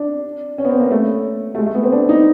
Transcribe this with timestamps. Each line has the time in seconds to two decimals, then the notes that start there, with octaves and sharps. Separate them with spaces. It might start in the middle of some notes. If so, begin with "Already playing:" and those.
Already playing: D4
0.58 C#4
0.65 B3
0.69 C4
0.80 A#3
0.91 A3
1.55 A3
1.58 G#3
1.66 A3
1.75 B3
1.84 C4
1.92 D4
2.09 D#4